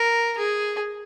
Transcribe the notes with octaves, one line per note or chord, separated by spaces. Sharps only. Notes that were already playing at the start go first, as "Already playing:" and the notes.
Already playing: A#4
G#4